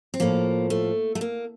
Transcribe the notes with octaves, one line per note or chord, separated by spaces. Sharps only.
C4
A2 F3 A#3
A3
A3
A#3